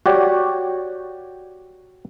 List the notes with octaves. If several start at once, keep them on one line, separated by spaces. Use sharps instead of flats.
F#4 G4 C#5 D5